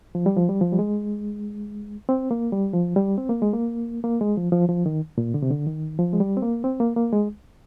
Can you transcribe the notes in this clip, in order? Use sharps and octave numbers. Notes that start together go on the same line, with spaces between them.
F3
G3
F3
G3
F3
G3
G#3
C4
A#3
G3
F3
G3
C4
A#3
G#3
A#3
A#3
G#3
F3
F3
F3
D#3
A#2
D3
C3
D3
D#3
F3
G#3
G3
C4
A#3
C4
A#3
A#3
G#3